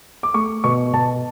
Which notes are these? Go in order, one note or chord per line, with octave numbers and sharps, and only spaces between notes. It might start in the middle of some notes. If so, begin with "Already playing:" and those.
D6
A3 C#6
B2 C#6
B2 A5